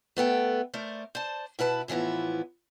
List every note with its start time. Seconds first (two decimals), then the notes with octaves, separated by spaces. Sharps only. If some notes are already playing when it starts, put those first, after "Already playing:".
0.17 A3 B3 A4 G5
0.74 A3 A#4 C5 D5
1.15 C5 D5 A5
1.59 B2 E4 B4 A5
1.88 A2 E3 F3 B3 E4